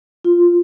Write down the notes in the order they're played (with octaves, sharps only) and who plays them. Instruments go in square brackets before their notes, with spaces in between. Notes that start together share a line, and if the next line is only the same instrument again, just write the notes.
[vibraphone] F4